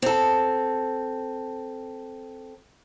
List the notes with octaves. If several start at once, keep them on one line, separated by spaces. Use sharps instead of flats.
C4 A4